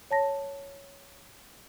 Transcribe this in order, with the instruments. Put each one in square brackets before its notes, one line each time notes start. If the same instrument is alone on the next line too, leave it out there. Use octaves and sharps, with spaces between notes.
[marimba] C#5 A5 A#6